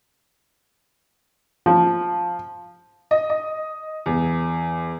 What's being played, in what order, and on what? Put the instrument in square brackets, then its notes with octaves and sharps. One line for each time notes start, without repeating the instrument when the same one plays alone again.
[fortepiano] F3
[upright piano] D#5
D#5
E2